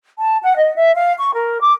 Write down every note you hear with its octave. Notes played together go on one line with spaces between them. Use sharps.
A5
F#5
D#5
E5
F5
C#6
A#4
D6